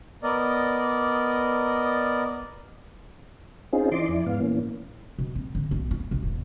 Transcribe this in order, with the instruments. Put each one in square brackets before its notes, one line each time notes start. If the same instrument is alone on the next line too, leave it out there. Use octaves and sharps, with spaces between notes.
[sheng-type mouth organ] B3 A#4 D5 D#5
[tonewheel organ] C4 C#4 D#4 F4 G#4
E3 D5 D#5 C6 D6
F2 E4 D5
G#2 B3 F5
A#2 E3 A#3 C#4
[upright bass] B2
C4
D3
B1
F4
B1
E1